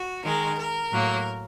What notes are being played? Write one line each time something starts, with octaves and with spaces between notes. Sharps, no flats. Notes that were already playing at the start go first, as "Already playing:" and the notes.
Already playing: F#4
D#3 G#3 A#4
A#4
A2 F#3 A#3